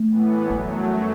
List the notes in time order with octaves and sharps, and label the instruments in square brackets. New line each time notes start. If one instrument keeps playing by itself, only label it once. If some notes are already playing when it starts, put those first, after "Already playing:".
Already playing: [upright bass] A3
[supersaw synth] A2 E3 B3
[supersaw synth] F#2 F#3 A3 [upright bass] G3